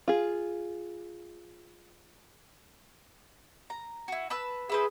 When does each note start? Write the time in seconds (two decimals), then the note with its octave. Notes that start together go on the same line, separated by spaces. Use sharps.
0.08 F4 G#4
3.70 A#5
4.08 E4 F#4
4.30 B4 A5 E6
4.69 E4 G#4 B4 C5